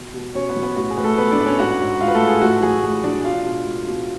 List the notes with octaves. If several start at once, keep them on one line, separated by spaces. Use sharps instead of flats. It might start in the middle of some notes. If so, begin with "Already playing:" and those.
Already playing: B2
B2
B2 C#4 C#5
B3 B4
F#3
B3 B4
A2 F#4
G#4
A2 B4
A3 A4
G#3 B3 B4
D4 D5
A2 B4
C#4 C#5
G#2 F#4 F#5
G#2
G#3 F4 F5
B4
A3 A4
G#3
G#4
A2 F#4
F#3 G#4
A2 G#4
F#3 D4 D5
B2 F4 F5
B2
G#3
B2